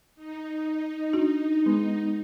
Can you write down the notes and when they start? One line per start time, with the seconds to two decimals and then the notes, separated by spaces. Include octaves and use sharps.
0.15 D#4
1.13 D4 F#4
1.66 G#3 B3